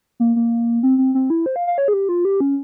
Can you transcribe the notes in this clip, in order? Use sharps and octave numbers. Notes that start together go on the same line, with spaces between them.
A#3
A#3
C4
C4
C4
E4
C5
F5
F5
C#5
G#4
G4
F4
G4
C#4